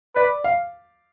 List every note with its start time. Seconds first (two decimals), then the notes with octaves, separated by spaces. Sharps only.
0.15 B4 D5
0.44 F5